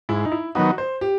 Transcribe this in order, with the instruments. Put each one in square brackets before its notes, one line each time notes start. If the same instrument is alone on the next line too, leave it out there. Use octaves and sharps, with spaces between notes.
[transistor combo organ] G#2 [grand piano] E4
[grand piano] D#4
E4
[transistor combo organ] D#3 F#3 B3 D#4 [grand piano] F#4
[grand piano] C5
G4